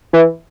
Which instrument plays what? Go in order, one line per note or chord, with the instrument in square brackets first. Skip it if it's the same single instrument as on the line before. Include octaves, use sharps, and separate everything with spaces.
[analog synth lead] E3